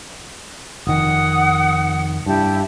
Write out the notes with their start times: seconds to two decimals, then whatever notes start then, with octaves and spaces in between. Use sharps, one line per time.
0.87 F1 D#3 F#5 D#6
2.26 G2 E4 G4 A5